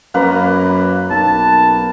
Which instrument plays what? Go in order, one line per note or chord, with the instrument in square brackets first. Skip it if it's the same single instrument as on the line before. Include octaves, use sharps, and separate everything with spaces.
[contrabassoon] F#2 [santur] A#3 B4 A#5
[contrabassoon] B1 [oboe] A5